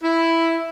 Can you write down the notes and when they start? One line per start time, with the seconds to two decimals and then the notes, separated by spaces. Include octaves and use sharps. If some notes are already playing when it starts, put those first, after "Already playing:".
0.02 E4